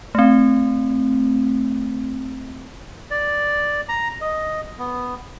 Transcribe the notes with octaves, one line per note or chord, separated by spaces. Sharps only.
A3 C4
D5
A#5
D#5
B3